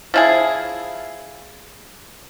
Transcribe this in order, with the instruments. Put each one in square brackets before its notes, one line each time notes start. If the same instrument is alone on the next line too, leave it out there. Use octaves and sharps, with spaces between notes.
[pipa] F3 E4 G#4